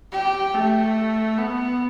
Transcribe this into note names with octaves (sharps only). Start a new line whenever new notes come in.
G4
A3
B3